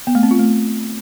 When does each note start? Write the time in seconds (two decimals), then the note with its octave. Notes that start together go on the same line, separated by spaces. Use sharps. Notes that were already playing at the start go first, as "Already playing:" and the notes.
0.07 B3
0.15 A3
0.23 C4
0.31 F4
0.39 A3